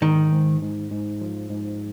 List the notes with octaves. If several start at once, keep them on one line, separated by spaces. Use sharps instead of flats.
G#2 D#3
G#2
G#2
G#2
F3
G#2